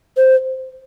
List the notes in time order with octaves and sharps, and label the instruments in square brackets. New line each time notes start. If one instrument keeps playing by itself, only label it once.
[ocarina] C5